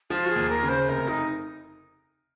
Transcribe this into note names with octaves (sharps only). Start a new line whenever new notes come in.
F3 F4
F#4
G#4
D#2
A#4
C#3
C5
F1 A#4
D#4